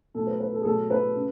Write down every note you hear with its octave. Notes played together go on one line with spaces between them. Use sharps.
B2 F#3 A3 A4
B4
B4
A4
G#4
B2 F#3 A3 A4
B4
C#3